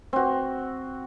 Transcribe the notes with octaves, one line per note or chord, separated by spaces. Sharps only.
C4 F#4